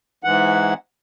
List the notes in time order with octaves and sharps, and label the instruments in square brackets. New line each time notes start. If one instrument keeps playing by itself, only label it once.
[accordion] G#2 E3 F#5